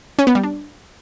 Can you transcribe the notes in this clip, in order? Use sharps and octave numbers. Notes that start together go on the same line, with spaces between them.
C#4
B3
G3
D4